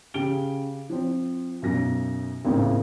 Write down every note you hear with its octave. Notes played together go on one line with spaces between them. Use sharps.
C#3 G4 D7 G7
F3 C4
B1 F#2 A#6
G#1 D#2 A2 C#3